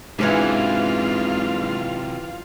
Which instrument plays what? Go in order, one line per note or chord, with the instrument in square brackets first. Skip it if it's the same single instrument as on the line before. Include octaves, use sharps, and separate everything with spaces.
[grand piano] G#2 [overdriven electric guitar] C3 F#3 [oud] E3 C#4 D4 [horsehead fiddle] F4 F5